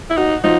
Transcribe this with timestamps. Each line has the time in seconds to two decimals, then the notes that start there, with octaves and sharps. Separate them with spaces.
0.10 E4
0.17 D#4 F#4
0.44 F3 D#4